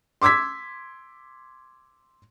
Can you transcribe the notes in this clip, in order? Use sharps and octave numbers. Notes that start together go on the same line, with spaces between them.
C6 D6 E6 G#6 B6